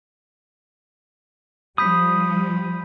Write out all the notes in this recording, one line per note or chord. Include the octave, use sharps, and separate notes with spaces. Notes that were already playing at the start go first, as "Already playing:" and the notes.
F3 G3 B5 D#6 G6 B6